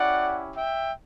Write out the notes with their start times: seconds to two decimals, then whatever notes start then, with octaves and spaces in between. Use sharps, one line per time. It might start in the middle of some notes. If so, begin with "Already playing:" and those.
Already playing: C#4 E4 G4 D5 F#5
0.55 E5 G5